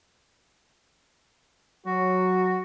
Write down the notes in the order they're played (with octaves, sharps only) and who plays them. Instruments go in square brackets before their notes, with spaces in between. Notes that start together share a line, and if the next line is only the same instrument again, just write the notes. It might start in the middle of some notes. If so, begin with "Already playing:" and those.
[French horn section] F#3 [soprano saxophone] F#4